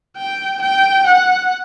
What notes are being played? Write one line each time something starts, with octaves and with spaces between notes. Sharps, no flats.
G5
G5
F#5